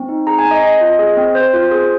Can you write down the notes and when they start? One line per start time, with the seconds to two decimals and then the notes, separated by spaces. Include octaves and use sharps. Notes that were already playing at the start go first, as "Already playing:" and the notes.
Already playing: C4
0.09 D#4
0.27 G#4 A#5
0.39 G#5
0.45 C4
0.51 D#5
0.63 C4 D#5
0.81 F4
0.99 G#4
1.17 C4
1.35 C4 C5
1.54 F4
1.71 G#4